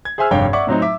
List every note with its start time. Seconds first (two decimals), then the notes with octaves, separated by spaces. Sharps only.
0.05 G#6
0.18 G#4 C5 E5 G#5 E6 F6
0.31 F1 G2 D4 C#5 F5 G5
0.53 D5 E5 F#5 C#6 D6
0.67 A2 F#3 C4 D#4
0.82 E5 D6